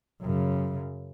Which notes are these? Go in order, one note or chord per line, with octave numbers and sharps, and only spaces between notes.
F#2 C#3